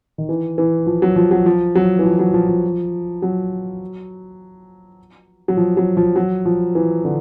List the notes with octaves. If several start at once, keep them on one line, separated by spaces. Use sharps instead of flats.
D#3
E3
E3
F3
F#3
F3
F#3
F3
F#3
E3
F3
F#3
F3
F3
F#3
F#3
F3
F#3
F3
F#3
F3
E3
D3